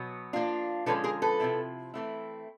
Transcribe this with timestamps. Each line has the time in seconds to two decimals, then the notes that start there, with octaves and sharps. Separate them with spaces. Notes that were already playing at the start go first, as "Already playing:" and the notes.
Already playing: B2 F#3 B3
0.33 F3 A#3 D4 F4
0.86 D3 F3 G#3 C#4 A4 B4
1.04 G#4 A#4
1.22 A4 B4
1.40 C3 F3 G#3 C4 E4
1.94 E3 A3 C4 E4